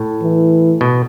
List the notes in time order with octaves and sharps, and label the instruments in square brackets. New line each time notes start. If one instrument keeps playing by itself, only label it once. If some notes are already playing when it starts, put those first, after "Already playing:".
Already playing: [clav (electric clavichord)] A2
[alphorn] E3
[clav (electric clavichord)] B2